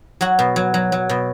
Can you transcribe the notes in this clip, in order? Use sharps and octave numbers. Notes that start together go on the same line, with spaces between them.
F#3 F#4
B2
F#3
F#3
F#3
B2